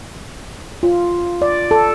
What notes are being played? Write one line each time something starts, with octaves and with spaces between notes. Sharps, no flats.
F4
D5
A4